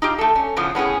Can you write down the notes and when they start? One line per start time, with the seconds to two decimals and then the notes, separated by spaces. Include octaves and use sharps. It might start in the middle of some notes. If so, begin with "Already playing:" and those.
0.02 D#4 F4 G4
0.18 A3 A4
0.35 C#4
0.57 C#3 E3 F3 B3
0.75 A2 B3 C#4 G#4